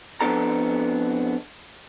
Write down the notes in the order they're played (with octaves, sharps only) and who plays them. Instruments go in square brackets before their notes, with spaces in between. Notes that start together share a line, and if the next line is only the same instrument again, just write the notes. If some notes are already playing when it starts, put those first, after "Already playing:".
[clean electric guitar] F2 G#2 B3 D4 A4 A#5